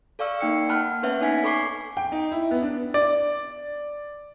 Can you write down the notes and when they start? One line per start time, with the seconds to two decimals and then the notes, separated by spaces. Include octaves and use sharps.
0.19 A4 D5 F5 C#6 E6
0.41 A#3 D#4 G5 C#7
0.69 A#3 F#5 A5 B5 F6 F#6
1.03 B3 C#4 B4 C#5 E5 F#5
1.21 D4 D#4 G#5 G#6 B6
1.44 A4 B5 C#6 D6 C7
1.97 G5
2.12 D#4
2.32 E4
2.51 B3
2.62 D4
2.94 D5